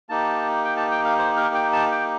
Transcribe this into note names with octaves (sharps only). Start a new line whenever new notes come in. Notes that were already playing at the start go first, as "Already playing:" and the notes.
A#3 D#4 G4 A5
G5
A5
G5
F5
C5
A#4
G5
A5
G5